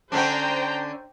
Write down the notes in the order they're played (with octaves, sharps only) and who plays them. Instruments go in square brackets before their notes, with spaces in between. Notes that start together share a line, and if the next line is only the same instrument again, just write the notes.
[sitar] D3 C#4 D4 [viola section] C5 G5 A#5